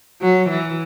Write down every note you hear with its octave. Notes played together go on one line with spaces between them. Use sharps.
F#3
E3